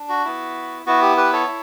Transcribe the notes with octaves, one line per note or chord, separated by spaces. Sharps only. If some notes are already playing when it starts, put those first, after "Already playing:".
Already playing: D4
F#4
B3 E4
B3 E4 F#4
G4
G4 B4
A4 C#5
E4